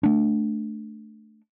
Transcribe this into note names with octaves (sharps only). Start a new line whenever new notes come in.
A3 D4